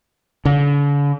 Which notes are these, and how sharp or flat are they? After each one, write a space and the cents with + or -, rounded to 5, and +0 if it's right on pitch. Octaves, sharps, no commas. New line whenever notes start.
D3 -45